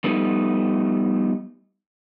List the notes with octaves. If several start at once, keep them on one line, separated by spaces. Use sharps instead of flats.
F3 G3 A3 B3 D#4